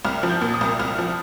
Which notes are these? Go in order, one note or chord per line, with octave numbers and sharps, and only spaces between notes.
C2 F6
F3
G6
A#2
D#6
C2
C2 F6
F3